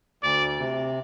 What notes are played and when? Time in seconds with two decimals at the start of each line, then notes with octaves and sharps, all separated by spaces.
0.23 D2 D5
0.59 C3